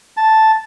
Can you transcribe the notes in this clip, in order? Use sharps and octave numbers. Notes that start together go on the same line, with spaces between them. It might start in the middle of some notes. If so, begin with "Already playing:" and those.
A5